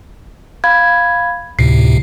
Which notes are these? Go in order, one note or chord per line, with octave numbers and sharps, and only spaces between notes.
F5 B5 G#6
D2 A2 C3 C7